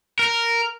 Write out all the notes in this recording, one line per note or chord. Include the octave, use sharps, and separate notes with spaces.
A#4